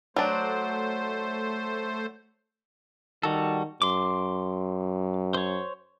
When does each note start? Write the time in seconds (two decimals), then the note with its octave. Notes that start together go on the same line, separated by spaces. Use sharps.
0.16 F#3 A3 D4 C5
3.23 D#3 G3 F#4 A4
3.82 F#2 C6 D6
5.34 C5 C#5